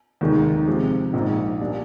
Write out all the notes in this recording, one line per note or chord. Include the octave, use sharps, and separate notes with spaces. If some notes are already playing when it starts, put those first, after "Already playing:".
F1 D#2 D#3 G#3
C3 F3 G#3
A#1 G#2 F3 A#3
A#2 G3 D4